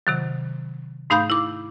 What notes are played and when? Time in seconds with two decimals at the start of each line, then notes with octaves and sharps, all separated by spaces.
0.07 C3 D#3 F#3
1.10 G#2 A3 D#4 F5 B5 G6
1.30 E4 D6